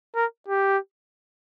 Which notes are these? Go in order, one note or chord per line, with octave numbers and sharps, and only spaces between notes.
A#4
G4